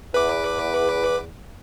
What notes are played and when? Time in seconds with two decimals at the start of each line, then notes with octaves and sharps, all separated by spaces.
0.14 E2 B4 D6